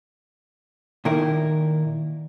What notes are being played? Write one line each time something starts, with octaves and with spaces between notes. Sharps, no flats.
A#2 D#3 E4 A#4